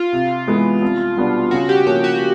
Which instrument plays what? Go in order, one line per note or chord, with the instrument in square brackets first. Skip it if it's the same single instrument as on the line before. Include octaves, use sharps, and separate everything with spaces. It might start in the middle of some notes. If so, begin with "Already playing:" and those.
Already playing: [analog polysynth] F4
[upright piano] C3
E3 G#3 B3
C2
B2 G3 B3 D4
[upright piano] C#3 [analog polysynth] F#4
[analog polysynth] G4
[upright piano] F3 A#3 C#4 [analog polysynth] G4
[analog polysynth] F#4